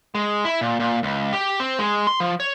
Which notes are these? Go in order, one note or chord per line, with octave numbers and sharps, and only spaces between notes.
G#3
E4
A#2
A#2
C#2
G4
C4
G#3
C6
F3
C#5